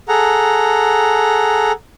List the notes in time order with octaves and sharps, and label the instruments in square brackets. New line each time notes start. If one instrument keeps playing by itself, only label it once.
[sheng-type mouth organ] G#4 A4 F#5 A#5